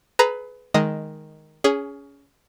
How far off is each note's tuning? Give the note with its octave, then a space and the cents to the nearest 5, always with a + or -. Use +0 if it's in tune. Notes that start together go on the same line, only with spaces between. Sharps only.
G#4 +35 B4 +15 A#5 +0
D#3 +0 G#3 +5 D#5 +5
C#4 +20 G#4 +0